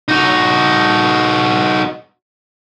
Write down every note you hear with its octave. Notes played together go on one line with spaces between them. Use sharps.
D#4 F#4